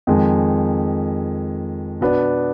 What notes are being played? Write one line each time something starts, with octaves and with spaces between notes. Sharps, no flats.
F2 D#3 G#3
B2 B3 D4